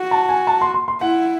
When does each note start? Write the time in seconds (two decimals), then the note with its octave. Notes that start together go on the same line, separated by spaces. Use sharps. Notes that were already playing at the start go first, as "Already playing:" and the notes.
Already playing: F#4
0.11 A5
0.29 G#5
0.47 A5
0.61 C6
0.74 C6
0.88 C6
1.01 E4 F#5